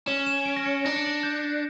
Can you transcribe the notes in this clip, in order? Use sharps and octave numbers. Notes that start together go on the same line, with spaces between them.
C#4 E7
E7
D7
A#6
C#7
D4 A#6
C#7
A#6
G6